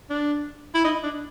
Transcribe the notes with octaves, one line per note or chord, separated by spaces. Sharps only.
D4
E4
D#4
D4